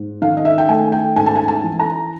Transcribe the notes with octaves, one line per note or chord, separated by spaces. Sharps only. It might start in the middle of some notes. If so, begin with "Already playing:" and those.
Already playing: G#2
D#3 F5
D#5
E5
G5
A3 G#5
G5
G#2 G#5
A5
G#5
A5
E3
A#5